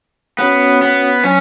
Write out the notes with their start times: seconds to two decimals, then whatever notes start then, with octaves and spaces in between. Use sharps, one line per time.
0.39 B3 C#4 F#4 C#5 F#5
0.82 B3
1.24 F#3 C#4